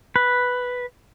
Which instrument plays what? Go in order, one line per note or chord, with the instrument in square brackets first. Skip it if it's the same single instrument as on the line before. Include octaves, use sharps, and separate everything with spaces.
[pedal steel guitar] B4